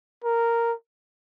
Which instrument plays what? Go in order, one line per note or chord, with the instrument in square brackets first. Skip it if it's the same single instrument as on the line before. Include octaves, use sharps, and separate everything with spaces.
[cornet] A#4